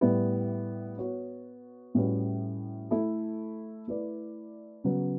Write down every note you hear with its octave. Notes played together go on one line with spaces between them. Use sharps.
A2 G3 B3 E4
B3 F#4 C#5
A2 G3 C#4 F#4 B4
A3 E4 A4
A3 E4 B4 D5
C#3 F#3 B3 F#4